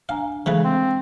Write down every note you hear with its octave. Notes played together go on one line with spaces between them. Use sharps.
D4 F5 G#5 A#5
C#3 E3 G#3 A3 B4
C4